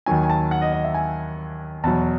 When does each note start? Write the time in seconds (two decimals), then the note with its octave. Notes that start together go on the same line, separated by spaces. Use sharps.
0.06 D#2 D#3 F#3 G#5
0.23 G#5
0.29 A5
0.51 F#5
0.61 D#5
0.72 D#5
0.84 E5
0.94 G#5
1.84 E2 B2 F#3 A5